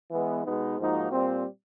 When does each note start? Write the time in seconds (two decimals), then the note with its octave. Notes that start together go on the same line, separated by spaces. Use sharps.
0.11 E3 G#3 B3
0.44 B2 G#3 B3 D#4
0.78 G#2 F3 A#3 D#4 F#4
1.11 A#2 G3 C4